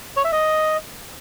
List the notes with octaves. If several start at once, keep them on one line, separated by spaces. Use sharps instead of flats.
C#5
E5
D#5